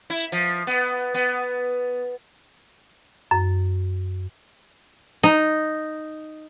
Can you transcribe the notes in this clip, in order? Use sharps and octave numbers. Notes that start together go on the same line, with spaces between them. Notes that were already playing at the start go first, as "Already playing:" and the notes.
E4
F3
B3
B3
F#2
D#4